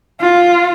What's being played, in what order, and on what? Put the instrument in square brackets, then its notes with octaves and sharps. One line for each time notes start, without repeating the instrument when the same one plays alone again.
[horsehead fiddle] F4